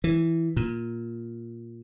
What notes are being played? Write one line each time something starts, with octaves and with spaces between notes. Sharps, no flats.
E3
A#2